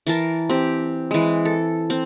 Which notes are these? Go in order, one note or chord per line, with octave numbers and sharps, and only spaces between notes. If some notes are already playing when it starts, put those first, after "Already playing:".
E3 A#4 A5
C4 G4
E3 G#3
A4
C4